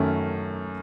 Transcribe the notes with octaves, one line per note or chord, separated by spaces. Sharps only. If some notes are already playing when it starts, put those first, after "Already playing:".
Already playing: F#2 D#3 A3 C#4